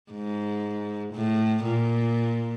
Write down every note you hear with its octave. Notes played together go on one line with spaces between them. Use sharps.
G#2
A2
A#2